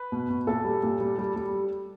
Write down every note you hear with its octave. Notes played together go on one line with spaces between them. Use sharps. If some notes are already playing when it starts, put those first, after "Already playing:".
Already playing: B4
B2
B2
A#2 A4
G3
A#2
G3
G3
G3